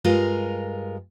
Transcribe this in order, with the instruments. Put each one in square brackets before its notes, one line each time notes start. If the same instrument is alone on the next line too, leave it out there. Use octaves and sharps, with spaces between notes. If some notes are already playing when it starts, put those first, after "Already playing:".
[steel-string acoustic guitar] G2 G#3 F4 A#4